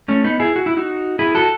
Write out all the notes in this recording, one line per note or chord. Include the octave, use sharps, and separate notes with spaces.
A3 C#4
B3 D#4
E4 G#4
F#4
E4
D#4 F#4
E4 G#4
F#4 A4